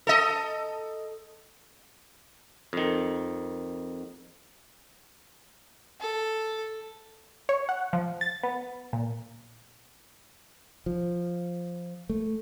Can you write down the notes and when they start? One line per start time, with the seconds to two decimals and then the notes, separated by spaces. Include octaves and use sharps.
0.07 A4 D#5
2.73 F2 D#3
6.00 A4
7.49 C#5
7.69 F#5
7.93 F3
8.21 A6
8.43 B3
8.93 A#2
10.86 F3
12.09 A3